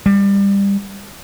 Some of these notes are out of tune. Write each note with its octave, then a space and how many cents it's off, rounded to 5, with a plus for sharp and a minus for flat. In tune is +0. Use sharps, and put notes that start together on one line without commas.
G3 +20